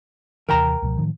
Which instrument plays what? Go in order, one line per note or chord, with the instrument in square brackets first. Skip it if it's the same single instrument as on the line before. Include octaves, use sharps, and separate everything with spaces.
[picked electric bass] D#2 C3 E3 [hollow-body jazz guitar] A#4 G5 A#5
[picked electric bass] C#2 B2 F3
A2 D#3 F3